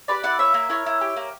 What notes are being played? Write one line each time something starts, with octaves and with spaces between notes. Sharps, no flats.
G4 B4 D5
E4 D5 F#5
A#3 C#5 E5
A#3
E4 A#4 C#5
E4
G4
A#3